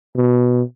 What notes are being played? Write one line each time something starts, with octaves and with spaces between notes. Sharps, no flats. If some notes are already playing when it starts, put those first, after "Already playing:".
B2